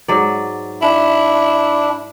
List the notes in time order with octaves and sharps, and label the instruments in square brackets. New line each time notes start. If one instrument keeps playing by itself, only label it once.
[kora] G#2 F#3 D5
[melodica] D4 [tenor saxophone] E4